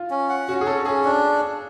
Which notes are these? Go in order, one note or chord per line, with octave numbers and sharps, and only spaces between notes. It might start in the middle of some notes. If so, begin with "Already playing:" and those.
Already playing: F4
C#4
F#5
C#4 F#4
G#4
C#4 A4
C#4 G#4
D4